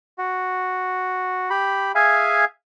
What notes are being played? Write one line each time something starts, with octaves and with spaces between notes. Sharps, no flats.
F#4
G4 B5
G#4 E5 F5 G#5